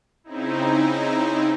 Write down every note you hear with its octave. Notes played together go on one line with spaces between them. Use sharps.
C#3 C4 D#4 E4